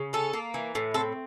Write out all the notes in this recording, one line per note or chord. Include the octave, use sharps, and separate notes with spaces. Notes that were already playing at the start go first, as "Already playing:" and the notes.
Already playing: C#3
C#4 A4
A#3
E3
A2
C4 A4